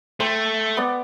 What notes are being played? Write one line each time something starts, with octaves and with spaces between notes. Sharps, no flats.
A3 G5 C6
B3 D5